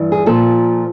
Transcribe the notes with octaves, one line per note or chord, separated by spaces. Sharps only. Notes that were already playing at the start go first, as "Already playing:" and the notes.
Already playing: G2 E3
G#4
A#2 F3 A4